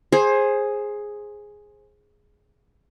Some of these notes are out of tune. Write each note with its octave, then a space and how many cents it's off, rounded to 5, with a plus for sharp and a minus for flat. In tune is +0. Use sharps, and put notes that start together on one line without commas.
G#4 +0 C5 +20